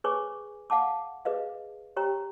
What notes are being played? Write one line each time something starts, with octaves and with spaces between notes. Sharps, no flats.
G#4 B4 C#5 G#5 C#6 D6
F5 F#5 A5 D6
G#4 B4 D#5 F5
G4 C#5 G5 A#5